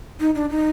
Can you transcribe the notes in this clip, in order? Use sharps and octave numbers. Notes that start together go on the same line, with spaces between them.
D#4
D4
D#4